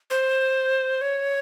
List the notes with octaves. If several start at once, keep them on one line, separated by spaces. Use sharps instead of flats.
C5
C#5